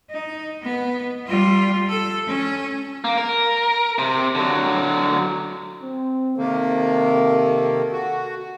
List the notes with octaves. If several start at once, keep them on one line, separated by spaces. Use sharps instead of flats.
D#4
B3
G3 F4
A4
C#4
A#3
A#4
C3
D3 F#3
C4
C3 D#3 A#3 A4
F#4